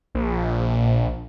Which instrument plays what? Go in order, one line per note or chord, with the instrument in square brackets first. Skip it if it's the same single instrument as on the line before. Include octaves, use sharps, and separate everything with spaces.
[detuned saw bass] A#1